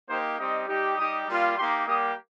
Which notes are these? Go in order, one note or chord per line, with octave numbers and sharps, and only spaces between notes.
A#3 D#4 G4 C5
G3 C4 D#4 G4 D#5
G3 D#4 G4
G3 D#4 G4 D#6
G3 A#3 F4
A#3 D#4 G4 C6
G3 A#3 G4 D#6